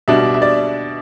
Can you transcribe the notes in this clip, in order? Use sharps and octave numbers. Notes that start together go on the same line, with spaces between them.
B2 G3 D4 E5
E5
D5